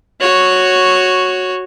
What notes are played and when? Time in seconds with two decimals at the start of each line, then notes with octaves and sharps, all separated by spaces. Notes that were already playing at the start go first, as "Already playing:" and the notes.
0.20 F#4 C#5